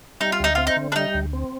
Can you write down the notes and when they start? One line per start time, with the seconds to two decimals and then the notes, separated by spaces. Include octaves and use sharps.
0.21 G3 D#4
0.32 F4
0.40 D2 D#4
0.55 C4 F4
0.67 D#4
0.77 D3
0.92 D4
0.96 G3 D#4
1.14 D2
1.33 C4